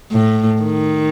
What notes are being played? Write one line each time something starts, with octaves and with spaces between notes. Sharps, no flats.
A2
D#3